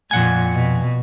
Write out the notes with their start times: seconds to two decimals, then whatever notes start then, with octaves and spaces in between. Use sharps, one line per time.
0.11 F2 A#2 F#5 G#5
0.53 B2